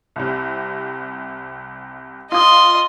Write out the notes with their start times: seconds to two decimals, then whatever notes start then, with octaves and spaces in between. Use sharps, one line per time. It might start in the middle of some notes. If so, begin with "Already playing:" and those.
0.16 C2 C3
2.32 F4 D#5 C6 D#6